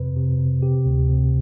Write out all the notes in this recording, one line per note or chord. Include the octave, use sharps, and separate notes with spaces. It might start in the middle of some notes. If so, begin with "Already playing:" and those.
Already playing: F2 C3 B4
C3
C3
C3 G4
D2
C3